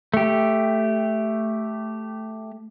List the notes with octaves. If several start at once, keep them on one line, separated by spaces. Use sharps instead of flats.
A3 G4